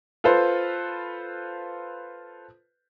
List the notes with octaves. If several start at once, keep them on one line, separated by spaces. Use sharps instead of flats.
F4 A4 B4 C5